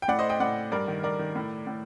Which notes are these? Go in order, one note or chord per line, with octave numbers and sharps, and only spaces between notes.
G5
A2 D5 F#5
C5 D#5
D#5 G5
A2 D5 F#5
G2 A#4 D5
D#3
G2 A#4 D5
D#3
A2
A2